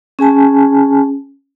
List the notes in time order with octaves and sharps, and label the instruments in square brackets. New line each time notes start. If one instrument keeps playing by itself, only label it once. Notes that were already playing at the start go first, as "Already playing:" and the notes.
[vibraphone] C#4 G#4 G#5 A5